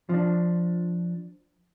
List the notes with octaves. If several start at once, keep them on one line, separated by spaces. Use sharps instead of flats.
F3 D4